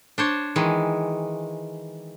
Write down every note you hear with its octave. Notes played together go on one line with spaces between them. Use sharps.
D4 C5 C#5
D#3 E3 G#3